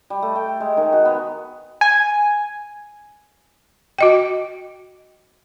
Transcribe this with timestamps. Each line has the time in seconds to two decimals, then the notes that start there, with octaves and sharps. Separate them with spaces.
0.10 G3
0.22 A3
0.35 G5
0.60 G#3
0.77 D#3
0.93 F#4
1.05 B3
1.81 G#5
3.99 F#4 D#5 G5